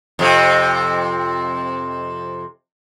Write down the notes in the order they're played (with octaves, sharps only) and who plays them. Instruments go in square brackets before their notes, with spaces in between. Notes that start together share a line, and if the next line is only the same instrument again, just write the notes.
[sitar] F2 C3